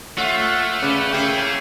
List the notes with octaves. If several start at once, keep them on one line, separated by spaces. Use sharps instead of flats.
A3 F4 C#5 E5 F#5
C#3 C#4 B4 D5 F#5
A#3 C#4 E4 G#4 G5